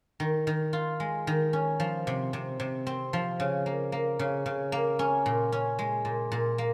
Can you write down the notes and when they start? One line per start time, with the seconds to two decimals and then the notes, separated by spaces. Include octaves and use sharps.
0.20 D#3
0.47 D#3
0.73 F4
1.00 G#3
1.27 D#3
1.53 C#4
1.80 F3
2.07 C3
2.33 C3
2.60 C3
2.87 C4
3.13 F3
3.40 C#3
3.66 A#3
3.92 A#3
4.19 C#3
4.46 C#3
4.72 A#3
4.99 C#4
5.26 A#2
5.52 C#4
5.79 G#3
6.05 A#2
6.32 A#2
6.58 A#3